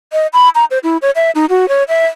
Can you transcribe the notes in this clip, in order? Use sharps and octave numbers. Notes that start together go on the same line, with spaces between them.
D#5
B5
A#5
C5
E4
C#5
E5
D#4
F#4
C#5
E5